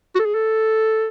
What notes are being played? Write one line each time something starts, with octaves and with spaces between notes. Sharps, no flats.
F#4
A4
G#4
A4